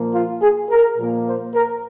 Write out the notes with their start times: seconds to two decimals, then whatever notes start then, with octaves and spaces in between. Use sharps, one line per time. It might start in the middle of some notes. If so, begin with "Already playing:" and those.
Already playing: A#2 F3 A#3
0.14 F4
0.42 G#4
0.70 A#4
0.98 A#2 F3 A#3
1.26 C5
1.54 A#4